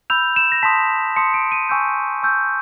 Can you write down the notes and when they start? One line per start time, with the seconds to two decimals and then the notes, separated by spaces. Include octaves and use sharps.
0.10 B5 E6 G6 F7
0.36 E7
0.52 A#6
0.63 A5 C6 D#6 B6
1.16 A5 C6 D#6 C#7
1.34 D7
1.52 D#7
1.69 G#5 C#6 E6 G6
2.23 G#5 C#6 E6 G6